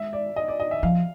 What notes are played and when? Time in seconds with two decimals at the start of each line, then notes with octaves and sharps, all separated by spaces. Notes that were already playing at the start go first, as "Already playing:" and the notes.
Already playing: G#3 E5
0.13 D5
0.36 D#5
0.48 D5
0.60 D#5
0.71 E5
0.83 F3 F5